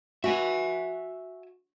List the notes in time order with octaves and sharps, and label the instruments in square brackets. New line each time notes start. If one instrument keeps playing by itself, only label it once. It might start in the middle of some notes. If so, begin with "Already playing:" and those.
[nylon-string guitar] F#4 [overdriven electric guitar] E5 G#5